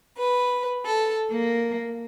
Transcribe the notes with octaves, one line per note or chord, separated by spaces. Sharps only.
B4
A4
A#3